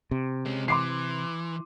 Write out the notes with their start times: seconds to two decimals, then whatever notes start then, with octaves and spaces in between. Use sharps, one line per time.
0.11 C3
0.46 G#3 C#4
0.68 E3 C6 D6 C7